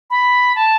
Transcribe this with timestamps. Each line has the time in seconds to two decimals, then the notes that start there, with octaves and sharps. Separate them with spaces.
0.10 B5
0.55 A5